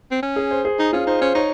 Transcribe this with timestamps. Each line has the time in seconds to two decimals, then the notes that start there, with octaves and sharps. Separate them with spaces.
0.11 C4
0.23 C#4
0.36 G#4
0.51 C5
0.65 G#4
0.79 D#4
0.93 C#4 F4
1.07 D#4 C5
1.21 C#4 C5
1.35 D#4 C#5